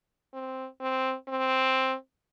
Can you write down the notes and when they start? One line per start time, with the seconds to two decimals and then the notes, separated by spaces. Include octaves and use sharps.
0.34 C4
0.81 C4
1.28 C4